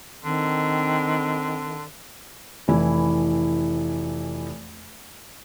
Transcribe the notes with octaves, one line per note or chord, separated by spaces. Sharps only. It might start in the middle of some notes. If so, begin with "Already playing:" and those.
D3 D#3 C4
F1 E3 E4